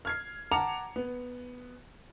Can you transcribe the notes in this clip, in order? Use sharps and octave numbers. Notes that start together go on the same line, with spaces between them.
F6 G#6 C7
F#5 A5 A#5 D6 C#7 F7
B3